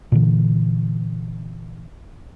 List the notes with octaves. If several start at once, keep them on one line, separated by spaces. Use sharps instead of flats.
A#2 D3 E3